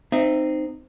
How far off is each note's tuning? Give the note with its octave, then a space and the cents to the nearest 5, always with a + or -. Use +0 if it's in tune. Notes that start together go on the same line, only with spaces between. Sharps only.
C4 -15 D#4 -15 E5 +25